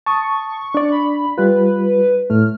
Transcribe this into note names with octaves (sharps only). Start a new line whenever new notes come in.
A5 C#6 D#6
D4 D5
B5
G3 F4 B4
A2 A3 F6